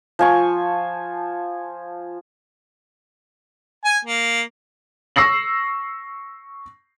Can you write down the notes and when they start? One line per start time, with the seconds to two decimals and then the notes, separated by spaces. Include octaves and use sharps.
0.19 F3 G#5 C#6
3.85 G#5
4.05 A#3
5.16 C#6 E6 A#6 C7 F#7